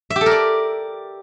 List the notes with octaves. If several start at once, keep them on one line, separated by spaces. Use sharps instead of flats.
E5
G4
A4
A#4
D5